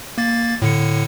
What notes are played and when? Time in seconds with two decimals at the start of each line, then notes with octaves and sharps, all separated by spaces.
0.18 A#3 A6
0.62 A2 D3 C#7